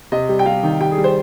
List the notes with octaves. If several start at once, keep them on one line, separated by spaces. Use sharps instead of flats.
C3 D#5
G3
G5
G3 F5
D#3
G3 G5
G#4
G3
C5